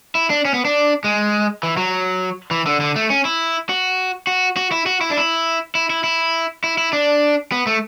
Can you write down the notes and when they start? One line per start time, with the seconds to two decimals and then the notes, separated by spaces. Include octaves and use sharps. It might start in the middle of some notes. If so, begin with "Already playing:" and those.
0.15 E4
0.30 D4
0.45 C#4
0.54 B3
0.65 D4
1.04 G#3
1.63 E3
1.77 F#3
2.51 E3
2.66 D3
2.80 D3
2.96 A3
3.10 C#4
3.25 E4
3.69 F#4
4.27 F#4
4.57 F#4
4.72 E4
4.86 F#4
5.01 E4
5.10 D4
5.18 E4
5.75 E4
5.90 E4
6.04 E4
6.64 E4
6.78 E4
6.93 D4
7.52 B3
7.67 A3